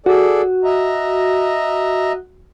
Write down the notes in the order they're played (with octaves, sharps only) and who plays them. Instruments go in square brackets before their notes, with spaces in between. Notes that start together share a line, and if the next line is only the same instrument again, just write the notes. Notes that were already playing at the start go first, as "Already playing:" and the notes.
[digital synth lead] F#4 [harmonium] G#4 A4 D5
[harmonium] D#5 E5 A#5